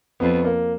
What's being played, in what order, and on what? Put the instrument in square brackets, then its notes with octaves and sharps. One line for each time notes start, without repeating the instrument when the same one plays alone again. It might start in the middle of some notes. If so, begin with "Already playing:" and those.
[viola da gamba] F2 [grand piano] B3
[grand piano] A#3